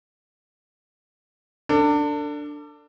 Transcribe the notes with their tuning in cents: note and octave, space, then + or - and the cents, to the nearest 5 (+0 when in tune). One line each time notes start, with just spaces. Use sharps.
D4 +0 A4 +35